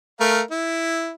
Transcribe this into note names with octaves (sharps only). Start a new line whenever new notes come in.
A3 A#4 F5
E4